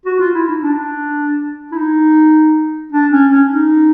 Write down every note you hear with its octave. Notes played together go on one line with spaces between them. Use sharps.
F#4
F4
E4
D#4
D4
E4
D#4
D4
C#4
C#4
D#4